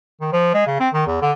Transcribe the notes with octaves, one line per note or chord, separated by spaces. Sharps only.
D#3
F3
G#3
C#3
C4
D#3
E2
D3